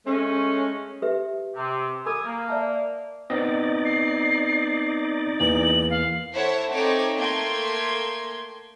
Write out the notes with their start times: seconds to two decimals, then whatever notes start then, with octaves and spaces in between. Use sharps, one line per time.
0.06 G#3 A3 C#4
1.02 G4 B4 E5
1.56 C3
2.06 A#4 G#5 B5 D6 D#6
2.25 A#3
2.48 D5 E5 A5
3.30 B3 C4 D#4 D5 D#5
3.85 C7
5.40 E2 E3 A#3 F#7
5.90 F5
6.34 E4 A4 C5 C#5 E5 F#5
6.70 A3 C4 D#4 A4 C#5 D6
7.15 A3 A#3 G5 C6 G#6